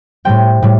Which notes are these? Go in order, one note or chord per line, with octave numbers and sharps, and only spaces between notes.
A2 G3 C4 G5
A2 G3